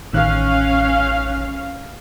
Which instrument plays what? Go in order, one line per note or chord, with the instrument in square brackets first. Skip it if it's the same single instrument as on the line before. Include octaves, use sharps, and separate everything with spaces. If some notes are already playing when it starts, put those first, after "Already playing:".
[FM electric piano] A1 D#3 F#6 [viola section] C#4 F5